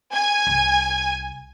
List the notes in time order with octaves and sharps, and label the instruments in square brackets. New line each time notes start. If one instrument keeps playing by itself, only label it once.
[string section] G#5
[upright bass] C2